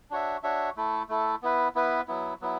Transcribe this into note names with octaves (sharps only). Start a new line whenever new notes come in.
D4 F#4 C#5 E5
D4 F#4 C#5 E5
A3 E4 A4
A3 E4 A4
B3 E4 B4
B3 E4 B4
F#3 B3 E4
F#3 B3 E4